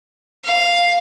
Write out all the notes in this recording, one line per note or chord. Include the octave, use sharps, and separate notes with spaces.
F5